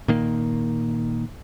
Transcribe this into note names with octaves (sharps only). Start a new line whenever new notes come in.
A#2 D#3 A#3